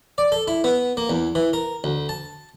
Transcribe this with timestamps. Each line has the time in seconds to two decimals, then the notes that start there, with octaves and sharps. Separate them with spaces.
0.18 D5
0.32 A4
0.48 E4
0.64 B3
0.97 A#3
1.10 E2
1.35 E3
1.53 A#4
1.84 D2
2.09 A5